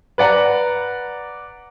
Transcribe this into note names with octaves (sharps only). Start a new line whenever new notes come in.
B4 D5 F#5 A#5